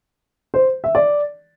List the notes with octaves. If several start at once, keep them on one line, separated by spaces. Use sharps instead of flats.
C5
E5
D5